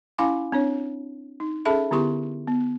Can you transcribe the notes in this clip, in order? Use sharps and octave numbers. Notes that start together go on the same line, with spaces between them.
C#4 E4 F5 G#5 B5 D6
C4 D4 C#5
D#4
C#4 G#4 A4 E5 A5 B5
D3 B3 E4 G4 C6 C#6
B3